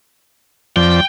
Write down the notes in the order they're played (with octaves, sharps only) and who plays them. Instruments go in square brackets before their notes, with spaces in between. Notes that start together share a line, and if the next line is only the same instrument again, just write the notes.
[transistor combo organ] F2 F3 D5 [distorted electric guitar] G5